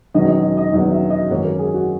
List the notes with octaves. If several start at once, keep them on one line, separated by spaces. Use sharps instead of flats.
E1 E2 D#3 F#3 C#4 D#5
D#5
D#5
D#5
E1 E2 D#3 F#3 C#4 D#5
E5
D#5
G#1 F#2 E3 A#3 C#4 C#5
A#4
G#4
F#4